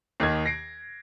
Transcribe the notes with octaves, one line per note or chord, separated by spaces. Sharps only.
D#2 D#3 D#5 G#6
A#6 C7 D7